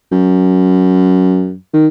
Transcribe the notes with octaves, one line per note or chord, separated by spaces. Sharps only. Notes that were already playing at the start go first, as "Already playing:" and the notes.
F#2
D#3